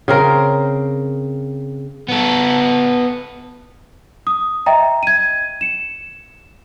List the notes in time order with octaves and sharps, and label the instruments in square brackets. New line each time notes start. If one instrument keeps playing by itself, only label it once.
[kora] C#3 C4 A#4
[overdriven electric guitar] B3 A4
[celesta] D#6
D#5 E5 G5 A#5
G#6 D#7
C#7 E7